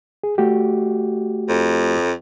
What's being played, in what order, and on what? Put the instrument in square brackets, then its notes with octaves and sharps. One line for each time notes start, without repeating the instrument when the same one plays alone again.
[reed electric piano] G#4
A3 F#4 G4
[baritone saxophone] F2